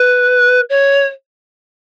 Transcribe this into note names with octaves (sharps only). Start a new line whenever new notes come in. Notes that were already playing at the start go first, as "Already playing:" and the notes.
Already playing: B4
C#5